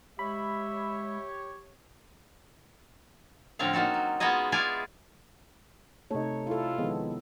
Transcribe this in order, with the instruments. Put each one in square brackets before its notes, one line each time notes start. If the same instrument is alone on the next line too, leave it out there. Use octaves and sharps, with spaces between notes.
[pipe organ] G#3 [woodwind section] G4 C#5 [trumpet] E5 [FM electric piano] B5
[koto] A2 D3 F3 C4 C#4 F5
A#3 D#4 F#4 A4
F#3
G#3 B3 F4 F#4 G#4 D#5
E4 F4 G#4 D5 F5 G#5
[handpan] C3 C#5 [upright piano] A3 D#4
[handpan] E4 A4 [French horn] F4
[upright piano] D#3 F3 G#3 [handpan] B3